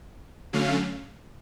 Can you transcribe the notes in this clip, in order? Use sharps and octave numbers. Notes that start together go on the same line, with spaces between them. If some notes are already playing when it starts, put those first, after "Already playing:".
D3 F#3 A3 C#4 F5